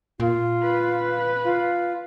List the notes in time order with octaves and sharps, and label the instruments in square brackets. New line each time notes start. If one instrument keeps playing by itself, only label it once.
[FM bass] A#2 [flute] F4
[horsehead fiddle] B4
[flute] F4